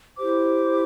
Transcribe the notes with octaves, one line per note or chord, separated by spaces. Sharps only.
E4 G4 C5 D6